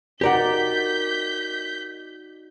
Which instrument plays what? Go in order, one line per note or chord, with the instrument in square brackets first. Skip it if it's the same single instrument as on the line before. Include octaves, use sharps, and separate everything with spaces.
[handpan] D#4 F#4 D5 [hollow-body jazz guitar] G4 A#4 F#5 [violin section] G6 B6